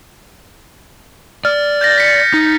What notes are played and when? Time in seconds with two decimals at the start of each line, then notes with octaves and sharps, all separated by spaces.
1.45 D5 F6
1.81 G6 A6 A#6
1.98 B6 C#7
2.34 D#4